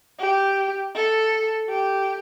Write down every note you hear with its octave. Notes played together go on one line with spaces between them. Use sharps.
G4
A4
G4